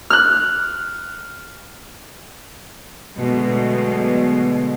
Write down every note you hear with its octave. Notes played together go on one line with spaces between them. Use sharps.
F6 F#6
B2 D3 F#3 G#3 A3